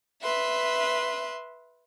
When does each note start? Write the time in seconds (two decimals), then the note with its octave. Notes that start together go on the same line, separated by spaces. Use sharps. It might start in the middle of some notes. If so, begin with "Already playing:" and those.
0.22 B4 E5 C6